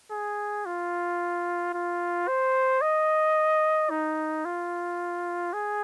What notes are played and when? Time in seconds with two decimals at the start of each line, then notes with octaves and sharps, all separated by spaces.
0.11 G#4
0.66 F4
1.74 F4
2.28 C5
2.81 D#5
3.90 D#4
4.45 F4
5.53 G#4